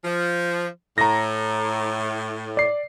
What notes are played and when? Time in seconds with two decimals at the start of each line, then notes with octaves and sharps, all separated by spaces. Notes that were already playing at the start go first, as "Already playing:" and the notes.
0.03 F3
0.98 A2 A#5 A#6
2.57 D5 C7